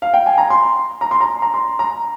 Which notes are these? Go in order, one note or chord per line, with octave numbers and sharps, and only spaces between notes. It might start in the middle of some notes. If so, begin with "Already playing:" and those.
F5
G5
G#5
A#5
C6
A#5
C6
A#5
A#5
C6
A#5